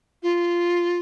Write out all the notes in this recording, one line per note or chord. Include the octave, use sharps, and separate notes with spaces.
F4